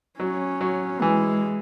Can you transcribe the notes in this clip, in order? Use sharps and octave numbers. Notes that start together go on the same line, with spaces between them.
F#3 C#4
F#3
E3 G#3